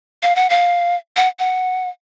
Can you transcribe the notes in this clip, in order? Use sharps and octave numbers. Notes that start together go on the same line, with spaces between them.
F5
F#5
F5
F#5
F#5